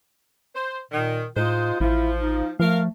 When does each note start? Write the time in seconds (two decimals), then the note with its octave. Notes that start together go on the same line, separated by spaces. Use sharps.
0.55 C5
0.92 A#2 D#3
1.36 A2 G#3 D#4 F4 C5
1.80 A1 F3 E4
2.18 D#4
2.60 F3 A3 A#4 F5